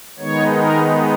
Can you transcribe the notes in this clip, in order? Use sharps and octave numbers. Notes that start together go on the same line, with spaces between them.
D#3 G#3 B3 D#4 C#5
A#4